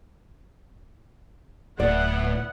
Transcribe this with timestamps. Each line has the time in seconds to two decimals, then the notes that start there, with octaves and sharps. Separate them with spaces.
1.80 D1 A2 B3 E4 D5 F#5